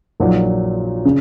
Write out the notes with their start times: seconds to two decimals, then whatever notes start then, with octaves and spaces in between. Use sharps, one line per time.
0.20 A#1 A#2 F#3 A#3 D#4
1.05 C#3